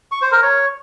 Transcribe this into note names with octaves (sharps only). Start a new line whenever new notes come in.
C#6
C5
A#4
C#5